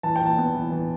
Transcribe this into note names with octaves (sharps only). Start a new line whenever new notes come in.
E3 A5
G5
E3 A5
B3
E3
E3